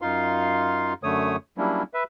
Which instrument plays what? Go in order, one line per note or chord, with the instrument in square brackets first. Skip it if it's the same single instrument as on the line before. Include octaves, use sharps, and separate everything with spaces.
[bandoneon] F#2 D#4 F4 F5 C6
F#2 D3 A3 C#5 D#6
F#3 G3 A#3 C#4 D4 E4
B4 E5